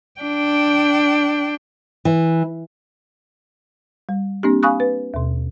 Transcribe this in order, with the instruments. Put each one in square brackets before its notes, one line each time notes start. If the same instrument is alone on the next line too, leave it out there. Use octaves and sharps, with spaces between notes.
[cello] D4 G5
[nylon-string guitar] E3
[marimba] G3
A#3 C4 D4 G4
F5 G#5 B5 C#6 D#6 F#6
B4
D#2 B2